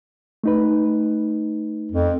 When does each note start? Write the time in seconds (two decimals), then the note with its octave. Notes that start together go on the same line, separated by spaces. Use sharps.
0.44 A3 D#4 B4
1.91 F2